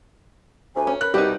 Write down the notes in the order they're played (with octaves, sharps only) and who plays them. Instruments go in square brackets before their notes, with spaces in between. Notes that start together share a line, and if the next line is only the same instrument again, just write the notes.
[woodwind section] D2 C3 [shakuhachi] G#5
[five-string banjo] C#4
[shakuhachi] A#4 [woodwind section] B4 B5 [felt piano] F#6
[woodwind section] C2 B2 D3 [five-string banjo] G3 C4 D#4 [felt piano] G4